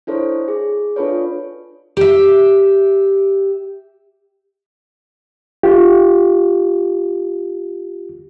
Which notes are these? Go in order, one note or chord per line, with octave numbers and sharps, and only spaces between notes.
D4 E4 A4 C5 C#5
G#4
D4 F4 A4 B4 C#5
G4 E5
F4 G4